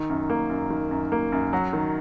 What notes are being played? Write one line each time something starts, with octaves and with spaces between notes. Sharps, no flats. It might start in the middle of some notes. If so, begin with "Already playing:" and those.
Already playing: D#3
F#2
A#3
F#2
D#3
F#2
A#3
F#2
F#3
D#3